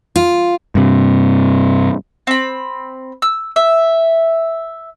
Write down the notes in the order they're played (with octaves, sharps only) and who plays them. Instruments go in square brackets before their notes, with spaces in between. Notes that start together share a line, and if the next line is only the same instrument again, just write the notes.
[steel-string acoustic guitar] F4
[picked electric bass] G2 C3
[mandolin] C4 B5
E6
E5